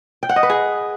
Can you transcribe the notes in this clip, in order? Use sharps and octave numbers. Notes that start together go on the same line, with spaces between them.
G5
F#5
D#5
B4
G#4